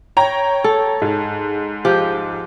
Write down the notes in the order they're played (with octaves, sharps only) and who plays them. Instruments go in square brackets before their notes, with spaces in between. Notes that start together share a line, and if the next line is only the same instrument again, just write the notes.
[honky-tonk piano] C#5 G5 A#5
[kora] A4
[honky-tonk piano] G#2
[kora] F3 G4